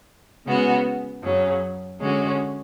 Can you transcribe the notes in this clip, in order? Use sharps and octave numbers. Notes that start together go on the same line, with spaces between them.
C#3 G#3 B3 F#4
F#2 C#3 F#3 C#4
D3 G#3 C#4 F#4